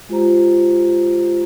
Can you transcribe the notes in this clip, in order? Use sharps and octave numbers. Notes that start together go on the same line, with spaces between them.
G#3 F4 G4 C5 A#5